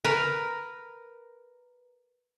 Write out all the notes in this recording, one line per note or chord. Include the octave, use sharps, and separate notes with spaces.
A#4 B4